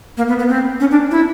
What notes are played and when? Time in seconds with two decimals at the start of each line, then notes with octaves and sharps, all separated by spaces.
0.17 A#3
0.28 B3
0.39 B3
0.49 C4
0.80 C#4
0.91 D4
1.11 E4